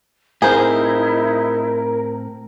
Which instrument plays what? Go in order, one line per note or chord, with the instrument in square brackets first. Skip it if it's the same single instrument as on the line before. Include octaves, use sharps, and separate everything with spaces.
[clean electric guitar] A2 C4 [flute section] D#4 E4 [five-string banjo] G#4 C5 [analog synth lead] A#4